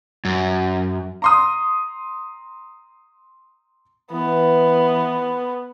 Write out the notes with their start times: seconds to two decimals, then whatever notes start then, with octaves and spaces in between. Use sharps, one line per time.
0.25 F#2
1.22 A#5 C6 D#6
4.12 E3 B3